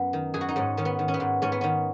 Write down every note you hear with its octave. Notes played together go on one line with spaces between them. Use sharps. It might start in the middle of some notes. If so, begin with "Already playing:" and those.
Already playing: F#2 B3
D#3
F#2 G#4
F#4
D#4
G#2 C#4
D#3 C#4
B3
D#3
C#4
B3
G#2
G#2 C#4
B3
D#3 C#4